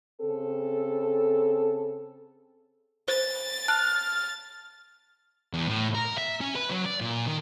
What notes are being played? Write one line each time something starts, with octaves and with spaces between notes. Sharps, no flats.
C#3 C4 A4
C5 A6
A5 F6 F#6
E2
A2
A#4
E5
C#4
B4
F#3
D5
A#2
D#3